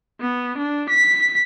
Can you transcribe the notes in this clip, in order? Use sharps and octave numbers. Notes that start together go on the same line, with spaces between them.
B3
D4
B6